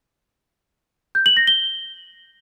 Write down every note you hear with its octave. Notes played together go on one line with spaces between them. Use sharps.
G6
F#7
A#6
G7